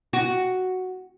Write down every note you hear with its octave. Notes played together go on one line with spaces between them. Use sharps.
F#4